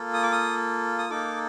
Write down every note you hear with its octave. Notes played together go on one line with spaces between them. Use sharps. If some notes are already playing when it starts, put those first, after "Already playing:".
Already playing: A#3 F4 A4
D#6
D6
D#6
D#6
A#3 D#4 A4 D6